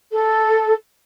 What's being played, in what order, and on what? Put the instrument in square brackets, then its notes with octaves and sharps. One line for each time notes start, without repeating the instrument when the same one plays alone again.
[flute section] A4